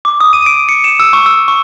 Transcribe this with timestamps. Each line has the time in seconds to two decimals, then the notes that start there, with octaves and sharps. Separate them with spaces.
0.05 D6
0.21 D#6
0.33 D#7
0.46 D7
0.69 C#7
0.84 E7
1.00 E6
1.13 C#6
1.26 E6
1.48 C#6